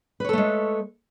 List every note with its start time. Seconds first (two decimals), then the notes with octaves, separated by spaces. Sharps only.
0.20 B4
0.24 C#5
0.29 A4
0.33 A3
0.38 G#3